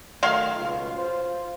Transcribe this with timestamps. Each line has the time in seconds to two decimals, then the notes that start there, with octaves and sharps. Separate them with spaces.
0.23 D#3 F#3 A3 F5 C6
0.56 C#2 B2 F4
0.96 F4 C5